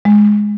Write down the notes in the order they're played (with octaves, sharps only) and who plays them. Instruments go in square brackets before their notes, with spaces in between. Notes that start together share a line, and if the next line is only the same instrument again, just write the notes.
[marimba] G#3